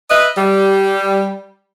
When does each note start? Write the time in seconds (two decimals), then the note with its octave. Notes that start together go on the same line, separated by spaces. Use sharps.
0.11 B4 D#5 E5
0.38 G3